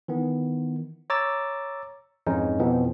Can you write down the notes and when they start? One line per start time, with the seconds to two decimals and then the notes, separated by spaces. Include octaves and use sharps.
0.08 D#3 E3 B3
1.10 C#5 A#5 D6 E6 A6
2.27 F2 G#2 E3 G#3 C#4 D#4
2.60 F2 B2 E3 F3 B3 C4